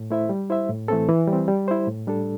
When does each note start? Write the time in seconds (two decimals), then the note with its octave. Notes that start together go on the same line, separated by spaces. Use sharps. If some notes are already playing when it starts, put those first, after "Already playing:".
Already playing: A2
0.11 A3 E4 C5 E5
0.29 G3
0.50 E4 C5 E5
0.69 A2
0.88 E3 A3 C4 A4
1.09 E3
1.28 G3
1.33 C4
1.48 G3
1.68 E4 C5
1.87 A2
2.07 G3 D4 A4